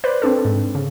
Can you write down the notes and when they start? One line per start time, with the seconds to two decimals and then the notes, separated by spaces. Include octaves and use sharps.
0.04 B4 C5 D5
0.22 C4 D4 A4
0.45 G#2
0.75 C#3